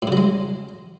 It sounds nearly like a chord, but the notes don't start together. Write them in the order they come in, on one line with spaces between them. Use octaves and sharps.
A2 C#3 F#3 G#3